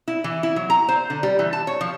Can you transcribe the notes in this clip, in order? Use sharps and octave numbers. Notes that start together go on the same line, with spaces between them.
E4
E3
E4
F#3
A#5
C5
D3
G3
E3
A5
C#5
F3